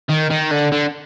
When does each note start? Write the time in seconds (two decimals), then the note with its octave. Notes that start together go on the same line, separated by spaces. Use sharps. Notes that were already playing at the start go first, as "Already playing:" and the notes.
0.10 D#3
0.31 D#3
0.52 D3
0.72 D3